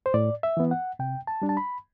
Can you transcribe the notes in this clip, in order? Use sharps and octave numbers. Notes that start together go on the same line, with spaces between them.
C5
A2 D5
E5
E3 B3
F#5
C3 G5
A5
G3 D4
A5
B5